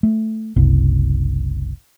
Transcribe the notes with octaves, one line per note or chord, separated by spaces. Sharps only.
A3
F#1 C2